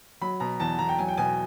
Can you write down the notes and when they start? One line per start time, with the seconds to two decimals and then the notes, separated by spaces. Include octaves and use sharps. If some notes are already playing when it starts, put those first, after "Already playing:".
0.21 F#3 B5
0.40 B2 A#5
0.60 E2 A5
0.79 E2 A#5
0.89 G5
0.99 F#3 G#5
1.08 G5
1.17 B2 G#5